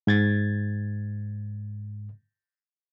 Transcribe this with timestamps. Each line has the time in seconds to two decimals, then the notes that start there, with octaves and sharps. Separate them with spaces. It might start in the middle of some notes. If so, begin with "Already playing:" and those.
0.07 G#2 G#6 A6